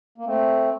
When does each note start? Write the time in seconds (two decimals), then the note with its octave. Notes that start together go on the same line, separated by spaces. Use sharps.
0.18 A#3
0.26 A3 C4